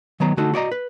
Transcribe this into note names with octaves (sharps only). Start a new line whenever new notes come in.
D#3 F#3 B3 A#5
D3 A3 D#4 F#4 A4
F#4 D5 D#5 A#5
B4